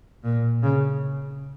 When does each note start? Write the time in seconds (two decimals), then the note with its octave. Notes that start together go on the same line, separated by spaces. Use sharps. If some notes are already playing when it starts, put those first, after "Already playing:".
0.24 A#2
0.63 C#3